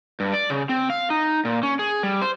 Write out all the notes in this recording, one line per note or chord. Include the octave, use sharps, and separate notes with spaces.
G2
D5
C#3
C4
F5
D#4
A#2
C#4
G#4
G3
C5